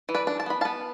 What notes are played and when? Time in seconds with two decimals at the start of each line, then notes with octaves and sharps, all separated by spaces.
0.09 E3
0.15 B4 D5
0.27 D4
0.40 A5
0.46 B3 B5
0.61 B3 F5 A5